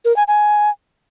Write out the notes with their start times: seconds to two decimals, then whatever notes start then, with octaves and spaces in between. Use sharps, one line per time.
0.05 A#4
0.16 G#5
0.28 G#5